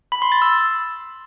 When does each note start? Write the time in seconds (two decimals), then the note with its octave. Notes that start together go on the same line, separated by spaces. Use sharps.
0.12 B5
0.22 C6
0.32 A6
0.42 E6